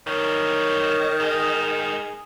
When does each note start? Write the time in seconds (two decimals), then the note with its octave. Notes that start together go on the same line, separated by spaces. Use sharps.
0.07 F#2 D#3 G3 C#5
1.20 G#2 G#4 D#5